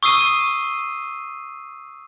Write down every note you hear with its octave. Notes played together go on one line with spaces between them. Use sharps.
C#6 D#6 E6 C7 D#7 G7